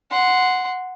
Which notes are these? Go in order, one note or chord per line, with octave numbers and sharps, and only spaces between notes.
F#5 C6